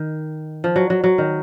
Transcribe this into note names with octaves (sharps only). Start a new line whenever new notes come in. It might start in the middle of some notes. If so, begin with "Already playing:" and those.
Already playing: D#3
F3
F#3
F#3
F#3
D#3